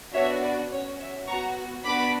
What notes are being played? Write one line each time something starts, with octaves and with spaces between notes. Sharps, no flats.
B3 D4 F#4 C#5 E5
B4 D5
C#4 F#4 C#5
C#5 E5
B3 F#4 A#5 C#6
B3 D4 F#4 B5 D6